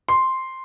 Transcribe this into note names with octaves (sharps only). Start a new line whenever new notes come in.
C6